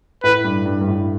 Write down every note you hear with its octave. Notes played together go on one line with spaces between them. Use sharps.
A2 B4
G2
G2
G2
A2